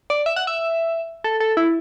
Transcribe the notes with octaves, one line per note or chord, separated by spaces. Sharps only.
D5
E5
F#5
E5
A4
A4
E4